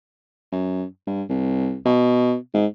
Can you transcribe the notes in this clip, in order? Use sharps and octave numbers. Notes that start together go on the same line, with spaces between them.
F#2
G2
C2
B2
G#2